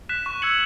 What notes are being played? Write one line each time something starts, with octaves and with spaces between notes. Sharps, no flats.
F#6 B6 E7
C#6
E6 G#6 C#7 F#7